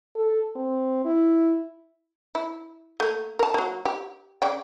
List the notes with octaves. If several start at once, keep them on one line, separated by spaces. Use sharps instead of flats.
A4
C4
E4
E4
A3 A#3
A#4 A5
F#3 A#3
G4
C#3 D5 G5